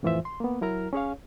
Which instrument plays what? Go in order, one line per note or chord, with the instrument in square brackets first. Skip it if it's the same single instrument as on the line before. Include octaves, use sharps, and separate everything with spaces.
[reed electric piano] F2 A2 E3 F4 C5 E5
C6
A#3 B3
F#3 E4 A#4 A#5 F6
C#4 G#4 C#5 F5